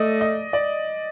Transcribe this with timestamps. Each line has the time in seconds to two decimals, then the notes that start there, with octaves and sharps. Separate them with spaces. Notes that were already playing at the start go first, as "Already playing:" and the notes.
Already playing: A3 D5 D#5
0.21 D#5
0.53 D5